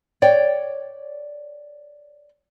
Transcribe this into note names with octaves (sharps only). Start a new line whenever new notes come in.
C#5 D5 G5